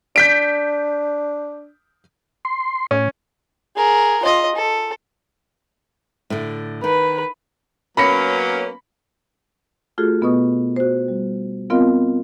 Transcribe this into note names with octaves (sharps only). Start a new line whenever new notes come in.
D4 G6 B6 D7
C6
A2 C#4
G#4 A#4
F4 D#5
A4
A2 D3
D#3 B4
F#3 A#3 B3 C#4 B5 A#6 C#7
A3 F4 F#4 G#4 A4
B2 B3 B4 D#5 C#6 D#6
F#4 C5
G3
B3 C4 F4 A#4 D#5 F5